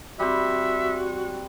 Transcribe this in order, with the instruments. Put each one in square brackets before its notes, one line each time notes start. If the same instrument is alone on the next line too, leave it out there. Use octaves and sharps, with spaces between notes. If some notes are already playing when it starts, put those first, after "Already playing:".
[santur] G3 C4 [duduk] F#4 [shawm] E5